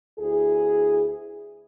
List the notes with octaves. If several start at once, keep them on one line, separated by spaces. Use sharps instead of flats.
D2 E4 G#4